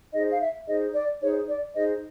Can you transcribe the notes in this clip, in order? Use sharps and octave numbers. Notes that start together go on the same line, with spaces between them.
D#4 G#4 C5 D#5
F5
E5
D#4 G#4 C5 D#5
D5
D#4 G#4 C5 C#5
D5
D#4 G#4 C5 D#5